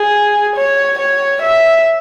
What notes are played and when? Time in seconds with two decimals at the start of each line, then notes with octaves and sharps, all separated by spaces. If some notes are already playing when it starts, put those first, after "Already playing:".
Already playing: G#4
0.56 C#5
0.99 C#5
1.42 E5